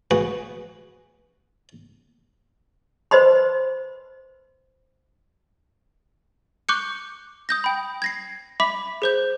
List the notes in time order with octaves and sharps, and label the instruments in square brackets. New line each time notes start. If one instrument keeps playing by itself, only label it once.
[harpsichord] F#4 G#4 B4 F#5
[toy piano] B4 C5 D#5 B5 C6
[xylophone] C#6 D6 F#6 G6 C#7
D#6 G6 A#6
G5 B5
G#6 A#6 C7
E5 B5 D6 B6
G#4 C5 G6